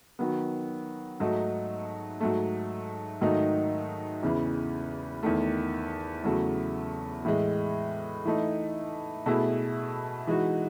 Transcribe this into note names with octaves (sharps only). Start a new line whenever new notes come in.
D#3 F#3 B3
G#2 F#3 A3 D#4
G#2 F#3 A3
G#2 D#3 F#3 A3 D#4
E2 C#3 E3
E2 D#3 A3
E2 C#3 F#3 A3
A2 E3 G#3
E3 A3 D#4
B2 A3 E4 G#4
E3 G#3 D#4 F#4